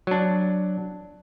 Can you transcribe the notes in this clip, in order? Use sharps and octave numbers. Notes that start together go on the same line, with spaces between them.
F#3 D4